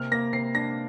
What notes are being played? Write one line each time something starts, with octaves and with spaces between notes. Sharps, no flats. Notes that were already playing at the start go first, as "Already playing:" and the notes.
Already playing: C3 A#3 F6
A#3 A#6
C3 C7
D4 A#6